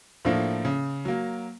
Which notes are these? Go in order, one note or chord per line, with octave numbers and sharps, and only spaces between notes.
A2 F3 A#3 D4
C#3
F#3 A#3